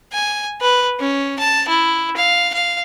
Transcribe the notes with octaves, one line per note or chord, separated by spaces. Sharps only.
G#5
B4
C#4
A5
E4
F5
F5